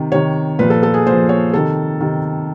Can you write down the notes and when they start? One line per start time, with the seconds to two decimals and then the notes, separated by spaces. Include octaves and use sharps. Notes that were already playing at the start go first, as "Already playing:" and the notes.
Already playing: C3 D#3
0.12 C3 D#3 C#5
0.59 A#2 F3 B4
0.70 A4
0.83 A4
0.94 G#4
1.06 A#2 F3 C5
1.29 C#5
1.53 C3 D#3 A4
2.00 C3 D#3